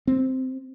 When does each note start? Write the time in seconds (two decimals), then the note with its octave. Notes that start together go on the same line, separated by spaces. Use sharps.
0.07 C4